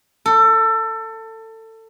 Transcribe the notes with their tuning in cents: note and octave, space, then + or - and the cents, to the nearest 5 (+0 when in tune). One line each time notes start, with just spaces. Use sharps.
A4 +25